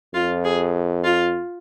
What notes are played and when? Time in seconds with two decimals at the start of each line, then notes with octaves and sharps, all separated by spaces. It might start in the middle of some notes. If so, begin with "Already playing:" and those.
0.14 F2 F4
0.45 G#4
1.04 F4